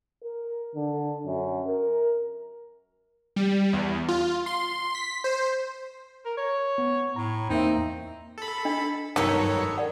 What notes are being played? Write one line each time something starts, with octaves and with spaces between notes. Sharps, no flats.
A#4
D3
F#2
A#4
G3
E2
F4
C6
B6
C5
A#4
C#5
B3
A2 A#5
E2 A#3 C4 D#4 E5
A4 B5
D4 D#5
G2 D#3 F#3 B3 D#4 A4 C#5
A#4 D5 F#5